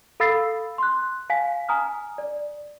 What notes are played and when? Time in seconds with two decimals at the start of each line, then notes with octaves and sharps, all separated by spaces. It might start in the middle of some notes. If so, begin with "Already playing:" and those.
0.20 A4 F5 B5 E6 A6 C7
0.78 C6 F#6
1.30 F5 G#5 B6
1.69 G#5 A#5 D#6 F6
2.18 D5